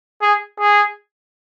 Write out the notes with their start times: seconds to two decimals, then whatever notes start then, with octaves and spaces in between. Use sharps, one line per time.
0.22 G#4
0.60 G#4